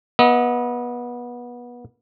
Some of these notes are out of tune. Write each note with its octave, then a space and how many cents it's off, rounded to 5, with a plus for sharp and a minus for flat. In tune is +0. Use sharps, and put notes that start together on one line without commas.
B3 -25 D#5 +35